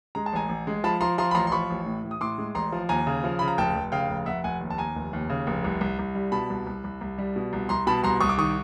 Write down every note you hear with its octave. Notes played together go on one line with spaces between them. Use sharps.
G#3 A#5
A5
A1 G#5 A#5
A1
G#3
F3 A5 B5
F3 A#5 C6
F3 A#5 C6
B5
A1 A#5 C6
C6
F3 B5 C#6
A1
A2
A1
D#6
A2 C6 D6
G#3
A1 A#5 C6
F3
D#2 G#5 A#5
C#3
F3
C#3 B5
A#5
F1 G5 A5
F1
C#3 F5 G5
F1
F1 E5 F#5
F1 F#5 G#5
D#2
A5
D#2 G#5 A#5
F1
D#2
C#3
F1
C2
C2
C2
G3
B2 A5 B5
C2
C2
C2
C2
G3
B2
C2
C2 A#5 C6
B2 A5 B5
C2 A#5 C6
C2 C#6 D#6
D6
D#3 C#6 D#6